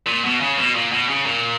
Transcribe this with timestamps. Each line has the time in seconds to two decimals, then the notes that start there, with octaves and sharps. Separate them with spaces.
0.06 A#2
0.24 B2
0.41 C#3
0.58 B2
0.74 A#2
0.92 B2
1.09 C#3
1.26 A#2